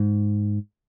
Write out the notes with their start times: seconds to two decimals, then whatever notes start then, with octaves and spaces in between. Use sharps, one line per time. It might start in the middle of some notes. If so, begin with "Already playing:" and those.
Already playing: G#2